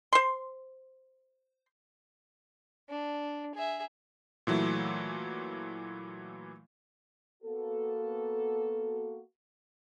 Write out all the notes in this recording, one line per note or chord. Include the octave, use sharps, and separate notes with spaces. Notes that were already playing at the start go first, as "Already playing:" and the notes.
C5 C6
D4
G#4 E5
A#2 E3 F#3 A3 E4
A#3 B3 F#4 A4